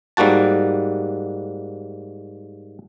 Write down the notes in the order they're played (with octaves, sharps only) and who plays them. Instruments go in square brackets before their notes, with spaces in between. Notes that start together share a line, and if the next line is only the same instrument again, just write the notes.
[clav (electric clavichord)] G#2 G3 A#3 F#4 A5